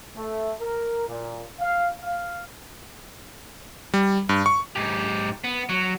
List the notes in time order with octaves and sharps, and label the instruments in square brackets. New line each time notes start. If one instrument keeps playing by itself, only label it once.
[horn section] A3
A#4
A#2
F5
F5
[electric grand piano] G3
G2
C#6
[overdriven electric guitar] G#2 G4
B3
F#3